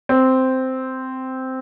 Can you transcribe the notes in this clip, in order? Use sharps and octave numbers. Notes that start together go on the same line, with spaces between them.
C4